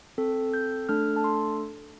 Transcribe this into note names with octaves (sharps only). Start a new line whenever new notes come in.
C4 A4
G6
A3 D4 A4 F6
A5
C6